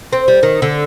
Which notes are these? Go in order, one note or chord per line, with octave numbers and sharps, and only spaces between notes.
C4
G3
D#3
D3